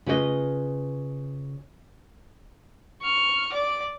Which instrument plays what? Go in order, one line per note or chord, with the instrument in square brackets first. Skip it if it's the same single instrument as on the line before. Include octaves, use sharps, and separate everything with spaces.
[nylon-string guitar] C#3 F4 B4 C#5 D#5
[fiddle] C#6 F6
D5 D6